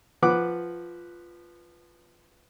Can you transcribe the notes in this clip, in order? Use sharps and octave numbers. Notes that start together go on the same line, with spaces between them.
F3 B4 F#5 D6